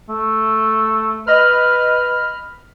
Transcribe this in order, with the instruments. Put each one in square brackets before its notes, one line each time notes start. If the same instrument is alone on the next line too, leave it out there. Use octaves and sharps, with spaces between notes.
[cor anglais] A3
[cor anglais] B4 [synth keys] D#5 B5 F6